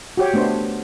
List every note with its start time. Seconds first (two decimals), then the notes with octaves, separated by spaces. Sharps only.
0.17 F#4 G4 C#5
0.34 A3 B3 D4 C5